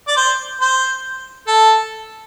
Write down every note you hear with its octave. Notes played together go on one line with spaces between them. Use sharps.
D5
C5
C5
A4